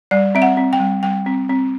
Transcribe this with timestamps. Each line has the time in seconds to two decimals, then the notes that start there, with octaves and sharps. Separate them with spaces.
0.11 G3 D5
0.35 C4 E5
0.42 F#5
0.57 C4
0.73 G5
0.80 G3
1.03 G3 G5
1.26 C4
1.49 C4